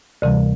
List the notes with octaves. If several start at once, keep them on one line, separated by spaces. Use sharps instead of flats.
D2 C3 E3 G3